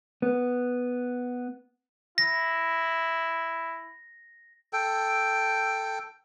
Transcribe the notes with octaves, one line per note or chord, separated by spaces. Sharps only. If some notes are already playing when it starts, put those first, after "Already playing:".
B3
E4 A#6
A4 G5